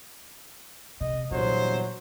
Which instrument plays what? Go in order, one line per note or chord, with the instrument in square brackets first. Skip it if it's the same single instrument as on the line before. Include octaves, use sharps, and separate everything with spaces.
[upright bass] E1 C3 [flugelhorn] D#5
[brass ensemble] G1 E2 C5 [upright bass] A#2 [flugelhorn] F#3